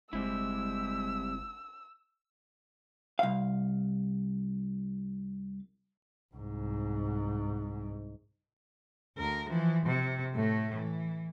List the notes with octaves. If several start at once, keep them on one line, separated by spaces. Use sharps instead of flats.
F#1 G3 G#3 C4 E4 E6
C2 F5
C2 G#2
D2 A#4
E3 F3
C3
A2 A3
E3